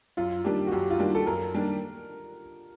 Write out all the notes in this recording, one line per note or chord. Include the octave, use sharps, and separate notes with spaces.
F#2 F4
D#3 G3 A#3 D4 G4
F#4
F#2 G4
F4
D#3 G3 A#3 D4
A4
F#2 A#4
D#3 G3 A#3 D4